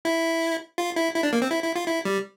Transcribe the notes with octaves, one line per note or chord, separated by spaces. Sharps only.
E4
F4
E4
E4
D4
A#3
C4
E4
E4
F4
E4
G3